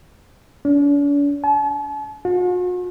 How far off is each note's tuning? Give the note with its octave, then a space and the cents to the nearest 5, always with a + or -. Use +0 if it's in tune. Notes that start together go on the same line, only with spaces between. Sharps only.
D4 -45
A5 -45
F#4 -45